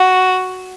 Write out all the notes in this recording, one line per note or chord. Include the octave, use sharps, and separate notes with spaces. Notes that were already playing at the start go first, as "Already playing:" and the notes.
Already playing: F#4